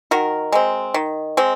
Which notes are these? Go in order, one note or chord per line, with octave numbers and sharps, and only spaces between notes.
D#3 F#4 A#4
G#3 C4
D#3
G#3 C4